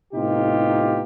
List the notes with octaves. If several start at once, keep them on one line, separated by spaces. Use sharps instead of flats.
A2 C3 B3 D#4 F4 G4